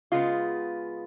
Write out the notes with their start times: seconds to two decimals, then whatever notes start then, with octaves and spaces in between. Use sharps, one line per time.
0.12 C#3 G#3 B3 F4